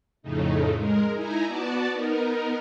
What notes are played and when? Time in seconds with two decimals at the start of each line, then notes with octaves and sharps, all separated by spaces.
0.23 F2 A2 C#3 A3 D#4
0.74 G#3 A#4
1.14 D#4 E4 G#5 A#5
1.46 B3 F#4 D5 A5
1.91 B3 D#4 A#4